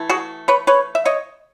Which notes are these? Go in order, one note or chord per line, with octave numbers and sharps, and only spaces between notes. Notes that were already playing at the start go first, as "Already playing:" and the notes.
Already playing: E3 A3
F#4 G#4
B4 C#5
B4 C#5
E5
C#5 D#5